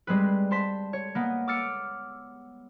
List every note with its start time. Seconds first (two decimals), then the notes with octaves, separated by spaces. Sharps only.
0.07 G3 G#3 C4 B4
0.51 C5 A5 C6 B6
0.93 C#5
1.15 A#3 B3 D#5
1.48 D6 E6 F6 A6 C#7 D7